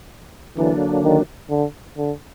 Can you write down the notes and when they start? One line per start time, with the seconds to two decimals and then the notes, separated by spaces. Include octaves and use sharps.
0.57 D3 E3 F#3 A#3 D4
1.04 D#3
1.50 D3
1.98 D3